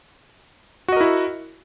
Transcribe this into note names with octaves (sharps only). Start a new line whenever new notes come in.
E4 F#4 A#4 D#5